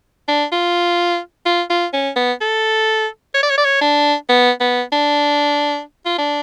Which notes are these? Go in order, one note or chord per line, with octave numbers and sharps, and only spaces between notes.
D4
F4
F4
F4
C#4
B3
A4
C#5
D5
C#5
D5
C#5
D4
B3
B3
D4
F4
D4